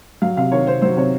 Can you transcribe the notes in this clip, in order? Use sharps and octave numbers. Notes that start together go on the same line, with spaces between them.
F#3 F5
C3 F5
D#3 C#5
C3 C5
F#3 C5
C3 C#5